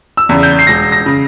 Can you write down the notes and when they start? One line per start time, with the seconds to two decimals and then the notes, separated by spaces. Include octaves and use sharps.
0.17 E6
0.29 E2 C#3
0.43 G6
0.59 C7
0.67 E1 A#6
0.92 A#6
1.06 C#3